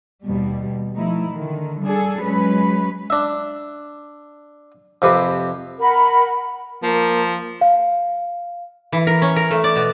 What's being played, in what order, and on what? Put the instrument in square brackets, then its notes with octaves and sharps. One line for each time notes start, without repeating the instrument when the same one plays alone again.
[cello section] D#2 B2 G3
F3 A3 D#4 E4
D3 D#3
G3 D4 G#4 A4
F#3 G#3 C#4 B4
[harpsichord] D4 E5
F2 C3 G4 B4
[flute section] A#4 F#5 B5
[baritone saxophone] F3 [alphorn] A#3
[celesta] F5
[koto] E3
A#4
C#4
A#4
A3
D5
B2